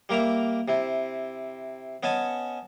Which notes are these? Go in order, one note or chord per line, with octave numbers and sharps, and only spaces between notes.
G3 A#3 A#4 E5 A#5
C3 E4
B3 C#4 D#5 G#5 A5